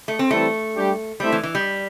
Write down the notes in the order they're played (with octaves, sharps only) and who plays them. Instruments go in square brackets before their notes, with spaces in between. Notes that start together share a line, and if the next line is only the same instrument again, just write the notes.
[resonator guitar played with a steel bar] A3
C4
[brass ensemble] E3 G3 C4 E4 A4 [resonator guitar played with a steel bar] A3
[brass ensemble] G3 D4 G4
[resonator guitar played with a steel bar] G3 [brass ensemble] A3 C4 E4 C5 E5
[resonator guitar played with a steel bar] E3
E3
G3